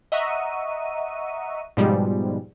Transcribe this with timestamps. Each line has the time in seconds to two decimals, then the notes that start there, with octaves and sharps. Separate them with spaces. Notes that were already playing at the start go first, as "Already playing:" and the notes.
0.12 D#5 E5 F#5 A#5 C#6 D#7
1.77 G#2 B2 F3 G3 G#3